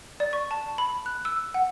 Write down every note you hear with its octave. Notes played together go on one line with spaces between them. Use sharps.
D5
C#6
A5
B5
F#6
E6
F#5